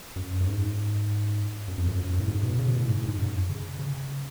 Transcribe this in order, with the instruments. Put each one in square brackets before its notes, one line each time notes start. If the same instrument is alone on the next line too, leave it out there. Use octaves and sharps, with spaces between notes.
[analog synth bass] F#2
F#2
G#2
F#2
F2
F#2
F#2
F#2
A2
G#2
B2
C#3
B2
A2
G#2
A2
G#2
F#2
C#3
C#3